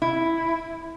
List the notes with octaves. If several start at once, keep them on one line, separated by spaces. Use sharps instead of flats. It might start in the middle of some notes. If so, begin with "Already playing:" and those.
E4